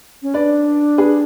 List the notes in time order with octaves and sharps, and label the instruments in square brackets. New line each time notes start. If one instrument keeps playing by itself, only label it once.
[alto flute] C#4
[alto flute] D4 [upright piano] B4 D5
[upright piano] G#4 B4